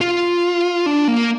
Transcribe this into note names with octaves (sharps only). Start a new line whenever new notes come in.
F4
D4
A#3